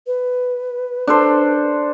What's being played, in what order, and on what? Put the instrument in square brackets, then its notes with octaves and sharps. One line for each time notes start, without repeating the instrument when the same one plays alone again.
[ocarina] B4
[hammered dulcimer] D4 A4 C5